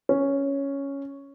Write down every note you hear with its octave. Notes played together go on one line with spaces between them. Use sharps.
C#4